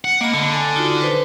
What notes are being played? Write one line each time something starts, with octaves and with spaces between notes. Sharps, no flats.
F#5
A#3 D#5 B5
D3
A4 G#5
D#4 F4 F#4
B4 C5